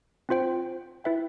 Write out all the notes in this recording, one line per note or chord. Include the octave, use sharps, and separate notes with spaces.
C4 F4 C5 G5
E4 B4 E5 G5